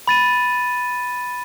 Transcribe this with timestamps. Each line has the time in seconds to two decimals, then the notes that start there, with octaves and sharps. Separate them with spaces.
0.08 B5 A6 D#7